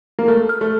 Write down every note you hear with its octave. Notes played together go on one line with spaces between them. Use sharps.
A#3
A3 F6
F6
A3